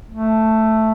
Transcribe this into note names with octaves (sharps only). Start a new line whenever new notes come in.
A3